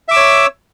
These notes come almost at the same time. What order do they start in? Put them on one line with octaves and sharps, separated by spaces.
E5 D6 E6 C#5